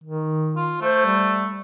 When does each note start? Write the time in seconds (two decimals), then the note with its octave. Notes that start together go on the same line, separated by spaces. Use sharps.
0.04 D#3
0.56 F4
0.81 A3 C5
1.06 G3